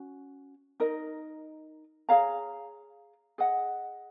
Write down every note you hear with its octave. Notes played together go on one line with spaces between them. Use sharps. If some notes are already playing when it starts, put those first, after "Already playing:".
Already playing: C#4 F#4
D#4 A#4 D#5
G#4 C#5 F5 A#5
G#4 D#5 F#5